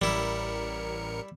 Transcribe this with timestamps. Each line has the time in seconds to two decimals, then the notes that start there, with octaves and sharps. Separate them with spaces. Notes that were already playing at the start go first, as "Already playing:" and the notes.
0.02 A1 G3 E4 A#4 C#7